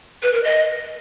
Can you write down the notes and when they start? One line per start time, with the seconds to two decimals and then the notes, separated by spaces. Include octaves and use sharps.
0.23 B4
0.33 A#4
0.44 D#5